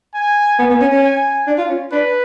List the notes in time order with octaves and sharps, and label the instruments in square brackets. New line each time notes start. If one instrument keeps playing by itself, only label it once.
[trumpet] G#5
[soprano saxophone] B3 [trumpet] G#5
[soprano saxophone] B3
C#4
C#4
[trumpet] G#5
[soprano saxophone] D4
F4
C#4
[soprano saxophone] D4 [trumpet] B4